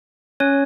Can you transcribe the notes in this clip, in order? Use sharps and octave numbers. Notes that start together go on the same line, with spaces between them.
C#4 C#5